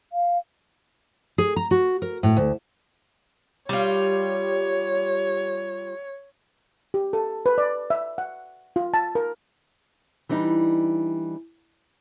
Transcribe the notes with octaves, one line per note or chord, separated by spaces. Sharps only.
F5
G#4
A#5
F#4
A#4
A2
D2
G3 F4 C#5
G4
A4
B4
D5
E5
F#5
F4
A5
A#4
E3 G3 D4 D#4